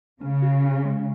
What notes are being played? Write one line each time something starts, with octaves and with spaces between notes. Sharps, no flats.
C#3 C#4
F#4
C#4
G#3